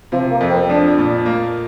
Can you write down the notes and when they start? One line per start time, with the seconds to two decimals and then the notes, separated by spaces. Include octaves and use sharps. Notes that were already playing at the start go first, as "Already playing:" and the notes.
0.12 C3 F3
0.32 A#3
0.40 F2
0.50 C4
0.69 F3 D4
0.97 A#2
1.26 A#3